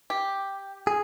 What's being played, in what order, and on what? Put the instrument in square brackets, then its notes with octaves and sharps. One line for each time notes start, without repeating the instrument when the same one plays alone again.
[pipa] G4
[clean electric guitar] G#4